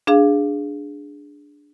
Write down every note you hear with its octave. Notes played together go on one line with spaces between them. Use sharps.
D4 G#4 F5